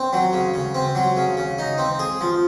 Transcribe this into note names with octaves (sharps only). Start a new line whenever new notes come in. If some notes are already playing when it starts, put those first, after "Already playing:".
Already playing: C4
F#3
C#3
C#3
C4
F#3
C#3
C#3
D#4
C4
G#4
F3